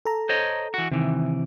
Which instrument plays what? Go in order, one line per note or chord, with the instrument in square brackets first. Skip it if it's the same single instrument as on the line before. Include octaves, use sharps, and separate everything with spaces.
[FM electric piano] A4 A#5
[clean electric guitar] C5 C#5 D#5
E3 F#4
[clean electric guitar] C3 E3 [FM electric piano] D#3